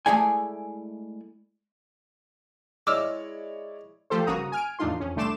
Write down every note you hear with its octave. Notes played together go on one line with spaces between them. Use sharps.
G#3 A3 E4 G#4 D5 G#5
G#3 E4 C#5 D5 D6 E6 F6
F3 A3 F4 G4 A4 C5
G1 C#3 A#3 F#4 A#5 D#6
G#5 F6 D7
E2 A2 D4 D#4 F4 C6
F2 C#4
C2 D3 A3 C6 D6 E7